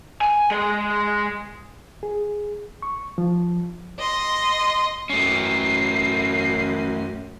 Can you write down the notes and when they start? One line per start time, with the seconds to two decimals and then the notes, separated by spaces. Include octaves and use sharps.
0.21 G#5
0.51 G#3 G#4
2.03 G#4
2.82 C#6
3.18 F3
3.99 D#5 C6
5.10 F#2 A3 C#4 C7